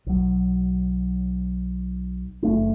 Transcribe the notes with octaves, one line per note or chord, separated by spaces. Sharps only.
B1 F#3
F#1 A3 D4